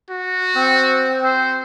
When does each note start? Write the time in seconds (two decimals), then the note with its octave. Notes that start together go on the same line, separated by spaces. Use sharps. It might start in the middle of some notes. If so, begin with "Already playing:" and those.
0.10 F#4
0.55 C4
1.24 C5